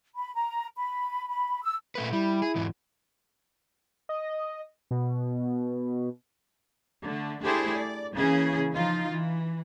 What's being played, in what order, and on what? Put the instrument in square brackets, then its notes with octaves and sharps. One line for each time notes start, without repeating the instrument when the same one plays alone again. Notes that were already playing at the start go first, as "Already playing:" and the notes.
[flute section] B5
A#5
B5
B5
E6
[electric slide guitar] A#2 A3 B4
[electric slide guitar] G3 [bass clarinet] E4
[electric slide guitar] G#4
E2 G#2 E3
[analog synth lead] D#5
B2
[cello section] D3 A3
A3 D4 E4 G4 G#4 C5
D5
C#3 E3 A#3 C#4 E4 G#4
F3 D#4 F4
E3